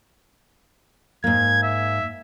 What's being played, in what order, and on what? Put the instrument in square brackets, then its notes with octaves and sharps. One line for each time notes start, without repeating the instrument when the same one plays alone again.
[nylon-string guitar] G#2 A#3 [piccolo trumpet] G#6
[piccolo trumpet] E5